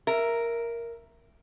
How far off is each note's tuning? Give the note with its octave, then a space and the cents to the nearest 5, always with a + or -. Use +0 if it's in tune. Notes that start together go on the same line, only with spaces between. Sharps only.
A#4 +0 E5 +10